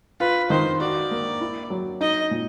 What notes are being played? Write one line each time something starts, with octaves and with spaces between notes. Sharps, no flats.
F4 B4
D#3 C5
F#4 D5
A#3
E4
F#3
D#4 D#5
A#2